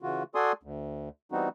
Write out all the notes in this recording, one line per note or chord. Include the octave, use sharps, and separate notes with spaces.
C#3 E3 F4 F#4
F#4 A4 D5 G#5 C6 D#6
D2
E3 G3 B3 C4 D#4 F#4